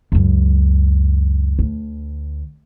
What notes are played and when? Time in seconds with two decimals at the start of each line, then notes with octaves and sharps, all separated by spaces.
0.12 C#2 F#2
1.59 D2